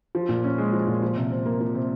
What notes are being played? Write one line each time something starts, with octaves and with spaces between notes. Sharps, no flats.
F3
A#2
C#4
G#3
F3
A#2
F3
C3
C3
A#3
F3
C3